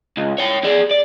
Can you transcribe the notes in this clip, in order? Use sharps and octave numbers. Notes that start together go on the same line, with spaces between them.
C#2
C#5 G5
G#4 D5
D5